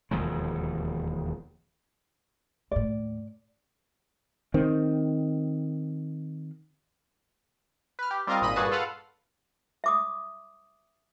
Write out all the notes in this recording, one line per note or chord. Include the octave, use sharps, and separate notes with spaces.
E1 D#2 F3 G#3
D#2 A2 D5
D#3 C4
B4 F6
G4
G3 C4 F4 A#4 D#5 F5
G#1 A#2 D#5 B5 D#7
G2 A#2 F#4 G#4 B4 A5
F4 A4 B4 F5 F#5
E5 D6 D#6